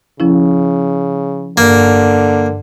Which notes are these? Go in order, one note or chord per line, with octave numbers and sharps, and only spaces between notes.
C#3 F3 C#4 E4
G2 D3 A#3